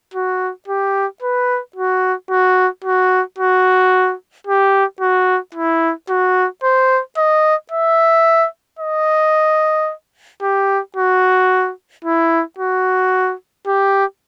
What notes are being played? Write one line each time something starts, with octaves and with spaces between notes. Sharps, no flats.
F#4
G4
B4
F#4
F#4
F#4
F#4
G4
F#4
E4
F#4
C5
D#5
E5
D#5
G4
F#4
E4
F#4
G4